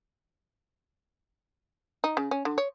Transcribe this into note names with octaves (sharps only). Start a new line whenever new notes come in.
D#4
C#3
C#4
D3
C#5